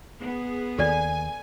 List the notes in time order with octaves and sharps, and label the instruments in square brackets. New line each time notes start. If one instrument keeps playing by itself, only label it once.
[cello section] B3 G#4
[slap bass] D#2 D#3 [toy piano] A4 D5 [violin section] G#5